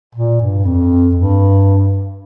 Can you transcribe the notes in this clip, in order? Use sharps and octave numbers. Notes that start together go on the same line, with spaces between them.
A#2
G2
F2
G2